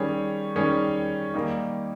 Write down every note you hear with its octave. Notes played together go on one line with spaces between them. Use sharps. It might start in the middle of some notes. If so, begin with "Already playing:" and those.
Already playing: D#3 G3 C#4 G#4 C#5
D#3 G3 C#4 G#4 C#5
D#3 G3 A#3 D#4